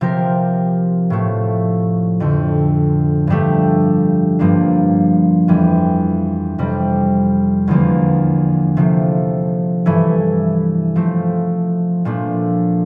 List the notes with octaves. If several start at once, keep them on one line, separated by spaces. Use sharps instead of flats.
C3 F3 C4 G4 A#4
A2 F3 A3
F2 D3 A3
G2 F3 A3 D4 G4
G2 F3 A#3 D4
F2 E3 G3
F2 C3 G3
E2 D3 F3 A#3
C3 F3 A3
G2 E3 A3 E4 A4
F3 A3 C4
A#2 F3 A3 D4